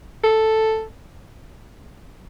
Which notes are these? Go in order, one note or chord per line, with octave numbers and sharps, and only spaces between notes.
A4